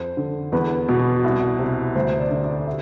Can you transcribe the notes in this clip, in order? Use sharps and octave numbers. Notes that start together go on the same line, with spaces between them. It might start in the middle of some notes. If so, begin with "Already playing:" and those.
Already playing: F2 C5
D3
E2 B4
B2
C2
C3
D2 C5
D5
D3
D5
E5